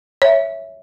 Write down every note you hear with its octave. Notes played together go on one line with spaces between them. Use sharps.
C#5 E5